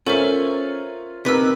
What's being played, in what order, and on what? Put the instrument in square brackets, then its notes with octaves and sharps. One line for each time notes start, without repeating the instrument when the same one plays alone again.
[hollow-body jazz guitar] C#4 [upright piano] F4 A#4 C#5 [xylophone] A4 C5 E5
[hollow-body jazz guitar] C3 B4 [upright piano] D#4 A#4 [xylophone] E6 B6